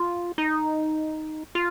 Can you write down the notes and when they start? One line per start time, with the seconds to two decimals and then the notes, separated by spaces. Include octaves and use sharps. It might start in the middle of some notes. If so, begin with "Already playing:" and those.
Already playing: F4
0.38 D#4
1.55 F4